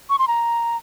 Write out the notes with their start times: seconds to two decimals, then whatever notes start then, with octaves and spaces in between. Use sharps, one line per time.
0.10 C#6
0.19 C6
0.28 A#5